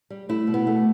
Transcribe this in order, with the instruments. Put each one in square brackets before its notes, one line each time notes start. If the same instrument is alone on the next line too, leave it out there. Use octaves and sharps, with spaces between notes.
[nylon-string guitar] G3
A3 E4
B2
B3
A3